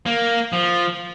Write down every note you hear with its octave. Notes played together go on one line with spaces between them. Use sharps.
A#3
F3